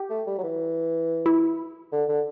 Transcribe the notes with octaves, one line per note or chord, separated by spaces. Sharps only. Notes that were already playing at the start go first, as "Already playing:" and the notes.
Already playing: G4
A3
G3
F#3
E3
E4
D3
D3